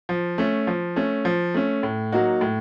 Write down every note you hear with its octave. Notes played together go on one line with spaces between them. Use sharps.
F3
A3 C#4
F3
A3 C#4
F3
A3 C#4
A2
F#3 A#3 D#4 F#4
A2